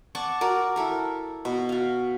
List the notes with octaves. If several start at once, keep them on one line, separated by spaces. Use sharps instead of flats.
D5 F#5 A5 C#6
F#4 A#4 D5
E4 A4 A#4
B2
F#4 F5